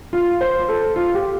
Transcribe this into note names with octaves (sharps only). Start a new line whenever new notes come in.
F4
C5
A4
F4
G4